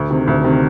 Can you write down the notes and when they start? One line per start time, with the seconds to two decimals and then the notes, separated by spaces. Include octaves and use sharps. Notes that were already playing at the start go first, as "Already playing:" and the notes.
Already playing: D2
0.10 C3 D#3
0.27 D2
0.44 C3 D#3